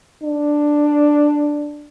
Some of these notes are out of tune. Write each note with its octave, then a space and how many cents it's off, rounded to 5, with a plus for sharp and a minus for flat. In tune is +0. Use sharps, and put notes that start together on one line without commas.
D4 +5